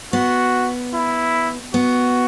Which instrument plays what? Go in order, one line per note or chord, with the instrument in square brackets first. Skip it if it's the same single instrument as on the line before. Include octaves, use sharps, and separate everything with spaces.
[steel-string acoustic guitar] B3 [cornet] F#4
[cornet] E4
[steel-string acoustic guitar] B3 [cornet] F#4